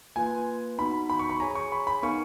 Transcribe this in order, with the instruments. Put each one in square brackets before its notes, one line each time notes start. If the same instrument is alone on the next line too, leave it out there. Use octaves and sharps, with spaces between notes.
[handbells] A#3 F4 B4 [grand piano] G#5
[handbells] B3 D#4 F#4 [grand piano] B5
[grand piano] B5
C#6
B5
[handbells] G#4 C#5 G#5 [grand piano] A#5
[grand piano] C#6
B5
B5
[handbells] B3 D#4 A#4 F5 G#5 [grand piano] C#6